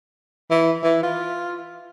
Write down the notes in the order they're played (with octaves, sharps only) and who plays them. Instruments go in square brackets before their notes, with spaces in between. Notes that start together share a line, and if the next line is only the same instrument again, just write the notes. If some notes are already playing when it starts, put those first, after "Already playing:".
[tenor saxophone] E3
E3
F4